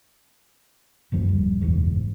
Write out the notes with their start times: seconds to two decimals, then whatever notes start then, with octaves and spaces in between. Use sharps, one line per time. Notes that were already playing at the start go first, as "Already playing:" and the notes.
1.12 D1 F#2 F3 A#3
1.29 D1 G3
1.61 F#1 B1 E2 G#2